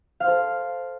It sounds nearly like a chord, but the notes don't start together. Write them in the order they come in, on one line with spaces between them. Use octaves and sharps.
F5 C5 A4